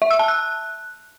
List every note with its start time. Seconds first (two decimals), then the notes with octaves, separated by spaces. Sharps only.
0.02 E5
0.11 E6
0.19 A5
0.28 F#6